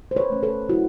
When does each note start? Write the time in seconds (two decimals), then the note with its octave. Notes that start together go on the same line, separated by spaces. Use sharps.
0.11 C5
0.16 B4 C#5
0.30 A3 C#4
0.43 A4 B4
0.69 F#3 E4 F#4